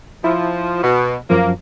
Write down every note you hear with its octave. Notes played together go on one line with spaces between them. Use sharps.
F3 E4
B2
F#2 F3 A#3